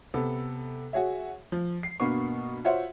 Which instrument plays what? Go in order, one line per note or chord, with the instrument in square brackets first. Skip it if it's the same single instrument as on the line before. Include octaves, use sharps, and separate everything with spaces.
[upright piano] C3 B3 A4
F#4 G#4 C#5 E5
F3
C7
G2 B2 A#3 B3 C#6
F4 F#4 C5 C#5 E5 F#5